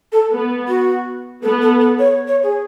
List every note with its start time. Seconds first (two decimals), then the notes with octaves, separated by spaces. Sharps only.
0.12 A4
0.31 B3
0.68 F#4
1.43 B3 A4
1.62 A4
1.80 A4
1.99 C#5
2.28 C#5
2.43 G#4